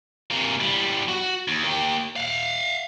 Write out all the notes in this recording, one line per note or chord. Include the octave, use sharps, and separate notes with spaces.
C3 A#3
E2 G3
F#4
D#2
A#3 G4
F5 F#5